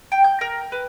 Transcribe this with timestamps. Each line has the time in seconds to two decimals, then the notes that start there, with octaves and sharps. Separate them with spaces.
0.12 G5
0.24 G6
0.41 A#4
0.72 B4